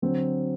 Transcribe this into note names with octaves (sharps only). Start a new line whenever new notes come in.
D3 F#3 C4